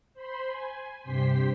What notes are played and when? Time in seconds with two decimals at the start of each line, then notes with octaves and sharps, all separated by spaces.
0.14 C5 B5 C6
0.47 G#5
1.03 G2 C3 G4 C5 C6 B6